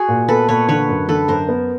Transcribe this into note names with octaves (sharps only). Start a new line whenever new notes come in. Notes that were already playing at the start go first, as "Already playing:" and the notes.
Already playing: F#4 G#4
A#2
B3 A4 B4
A#2 B4 C#5
D3 B4 C#5
F#2
D3 A4 B4
F#2 A#4 C5
B3